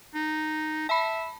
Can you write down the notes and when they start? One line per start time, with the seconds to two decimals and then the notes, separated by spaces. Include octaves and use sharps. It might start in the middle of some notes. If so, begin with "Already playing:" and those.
0.14 D#4
0.89 E5 A5 B5